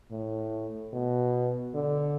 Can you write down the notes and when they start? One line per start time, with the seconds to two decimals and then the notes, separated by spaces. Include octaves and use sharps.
0.11 A2
0.93 B2
1.75 D3